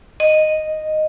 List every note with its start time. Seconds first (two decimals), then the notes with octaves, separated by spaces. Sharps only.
0.20 D#5